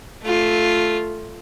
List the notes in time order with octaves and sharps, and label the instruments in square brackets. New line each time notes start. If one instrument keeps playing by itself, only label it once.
[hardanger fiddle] A3 F4